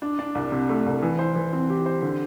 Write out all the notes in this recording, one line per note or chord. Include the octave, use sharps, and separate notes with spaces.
D4
D4
C2
C3
A3
C2
E3
C5
E3
C4
G4
C5
D3